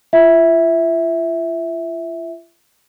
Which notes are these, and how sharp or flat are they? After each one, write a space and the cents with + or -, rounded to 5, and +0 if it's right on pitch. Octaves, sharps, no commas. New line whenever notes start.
F4 -40 E5 -5